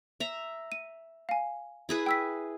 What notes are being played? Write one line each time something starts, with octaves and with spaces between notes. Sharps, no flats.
E5 A#5
D#7
F5 G#5
E4 G#4 B4
G5 E6 B6